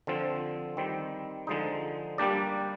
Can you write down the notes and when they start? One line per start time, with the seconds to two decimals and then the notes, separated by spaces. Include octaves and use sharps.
0.07 D3 F3 C4
0.77 D#3 G3 C4
1.47 D3 F3 G#3 D#4
2.18 G3 A#3 D4 G4 D5